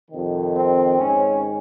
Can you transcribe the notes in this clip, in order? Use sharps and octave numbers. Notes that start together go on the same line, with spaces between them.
F2 C3 D#3
C4
G#2 D#3 C#4